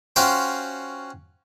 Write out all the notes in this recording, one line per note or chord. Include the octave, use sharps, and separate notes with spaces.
C#4 F4 F#4 C5 G5